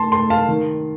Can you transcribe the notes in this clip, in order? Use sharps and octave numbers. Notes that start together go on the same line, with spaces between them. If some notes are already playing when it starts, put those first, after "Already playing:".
Already playing: A3 A5 C6
A3 A5 C6
F5 A5
D#3